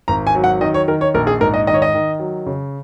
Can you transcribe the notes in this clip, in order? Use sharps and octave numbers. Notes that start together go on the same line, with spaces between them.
G#1 A#5
G#5
F#3
F#5
D#3 D#5
C#5
D#3 A#4
C#5
A#1 A#4
G#4
G#2 A#4
D#5
D#3 D#5
C#5
D#5
D#3
F#3
C#3